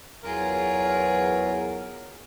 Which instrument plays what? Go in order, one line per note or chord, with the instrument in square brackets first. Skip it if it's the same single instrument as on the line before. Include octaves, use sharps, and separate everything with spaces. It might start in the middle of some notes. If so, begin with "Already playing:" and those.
[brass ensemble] E2 F#3 [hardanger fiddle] F4 G#4 [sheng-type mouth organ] A#4